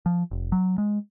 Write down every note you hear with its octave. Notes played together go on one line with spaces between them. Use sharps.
F3
F1
F#3
G#3